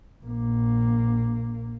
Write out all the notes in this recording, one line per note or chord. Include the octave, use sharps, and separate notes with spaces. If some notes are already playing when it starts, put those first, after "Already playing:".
A#1 A#3